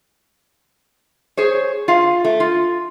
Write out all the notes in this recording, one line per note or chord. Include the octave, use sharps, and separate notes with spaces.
G#4 C5 C#5
F4 F5
A3
F4